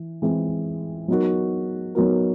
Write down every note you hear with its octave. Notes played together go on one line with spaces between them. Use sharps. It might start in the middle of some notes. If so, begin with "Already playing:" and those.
Already playing: E3
E3 G#3 C4 E4 G#4
F#3 B3 D#4 F#4 A#4
F#3 B3 D#4 F#4 A#4